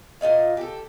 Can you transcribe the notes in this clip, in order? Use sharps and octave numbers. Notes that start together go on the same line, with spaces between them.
A#2 F4 D#5 F5
G4 A4